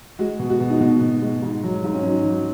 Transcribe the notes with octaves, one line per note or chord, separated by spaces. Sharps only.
G#3 F#4
B2
F#4
B2
D#4
B2 F#4
B2
G#3
G#2
F#3
G#2
C#4
F#3 D#4
F#3